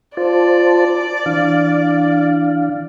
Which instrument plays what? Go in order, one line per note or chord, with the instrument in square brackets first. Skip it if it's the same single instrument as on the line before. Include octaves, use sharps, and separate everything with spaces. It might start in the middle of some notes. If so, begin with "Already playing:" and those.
[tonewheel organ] F4 C5 A5 [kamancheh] D5
[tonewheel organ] E3 D4 F5